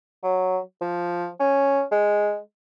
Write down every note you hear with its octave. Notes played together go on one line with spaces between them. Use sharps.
F#3
F3
C#4
G#3